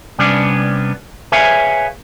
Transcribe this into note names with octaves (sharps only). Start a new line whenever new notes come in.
C3 G3 B3 C#4 D4
G#4 B4 C#5 E5 F5 G#5